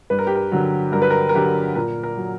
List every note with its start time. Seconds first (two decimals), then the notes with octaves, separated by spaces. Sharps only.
0.10 G2 B4
0.19 A#4
0.27 G4
0.35 A#4
0.52 D3 F#3
0.92 G2 A#4
1.02 B4
1.10 A#4
1.29 A#4
1.34 D3 F#3 G4
1.75 A#2 A#4
2.03 A#4
2.17 F#3